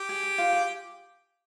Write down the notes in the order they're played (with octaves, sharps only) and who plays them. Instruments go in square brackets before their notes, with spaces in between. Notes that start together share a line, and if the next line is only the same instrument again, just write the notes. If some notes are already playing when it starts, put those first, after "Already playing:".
Already playing: [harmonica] G4
[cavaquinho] G#4
G#4
F4
G#4